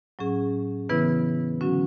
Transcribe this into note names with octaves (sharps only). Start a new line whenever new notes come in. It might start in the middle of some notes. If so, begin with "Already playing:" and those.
A2 F#3 C#4 G#4
C#3 E3 B3 E4 B4
D3 F#3 C#4 F#4